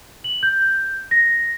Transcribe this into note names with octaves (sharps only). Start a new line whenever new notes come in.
F#7
G6
A#6